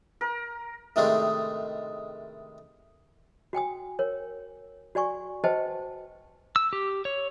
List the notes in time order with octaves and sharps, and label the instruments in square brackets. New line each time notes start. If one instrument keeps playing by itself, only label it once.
[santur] A#4
[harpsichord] A2 C3 D#3 G#3 A3 D4
[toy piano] F#4 G5 G#5 D#6
A#4 C#5
F#4 D5 G#5 C#6
F#4 B4 C5 D#5 G5 A5
[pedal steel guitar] E6
G4
C#5